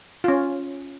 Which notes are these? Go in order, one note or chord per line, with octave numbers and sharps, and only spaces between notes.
C#4 F4